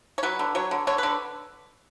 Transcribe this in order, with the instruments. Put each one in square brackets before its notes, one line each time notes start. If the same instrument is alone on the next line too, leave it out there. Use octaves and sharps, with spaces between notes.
[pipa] C#5
F#3 B4
D3
F#3 C#5
D3
D3 C#5
D3 B4